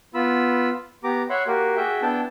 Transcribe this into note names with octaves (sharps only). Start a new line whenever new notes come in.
B3 F4 B5 E6
B3 G4 A#5 D6
C#5 E5 F#5 B5 C6
A#3 F#4 G4 A#4
F#4 G#4 E5 G5
B3 D4 E4 G5 A5